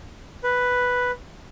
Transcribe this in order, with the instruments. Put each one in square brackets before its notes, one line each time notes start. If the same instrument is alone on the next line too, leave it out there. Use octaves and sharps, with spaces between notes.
[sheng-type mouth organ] B4